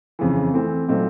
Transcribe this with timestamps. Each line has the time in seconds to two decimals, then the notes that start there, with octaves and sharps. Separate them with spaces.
0.19 F2 C#3 E3
0.54 E3 A3 C4
0.88 A#2 F#3 A3 C4 D#4